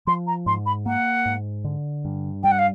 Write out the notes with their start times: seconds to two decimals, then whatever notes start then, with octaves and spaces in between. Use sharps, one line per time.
0.07 F3 C6
0.27 A#5
0.46 G#2 C6
0.66 B5
0.86 A#3 F#5
1.25 G#2
1.64 D3
2.05 G2
2.43 G3 G5
2.51 F#5
2.59 F5